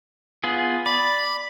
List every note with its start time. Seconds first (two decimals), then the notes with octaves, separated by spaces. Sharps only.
0.44 B3 F4 G#4
0.86 D5 B5